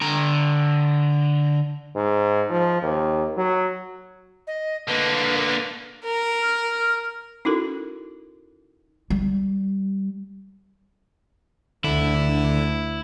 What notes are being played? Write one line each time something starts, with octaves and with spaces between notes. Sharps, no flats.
D3 A#5
G#2
F3
D#2
F#3
D#5
D3 A#3 B4
A#4
F6
C#4 D#4 E4 F#4 A4 A#4
G3
D2 D3 E4